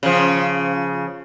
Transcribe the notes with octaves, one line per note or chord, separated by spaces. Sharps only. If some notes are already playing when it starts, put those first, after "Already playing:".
C#3 F3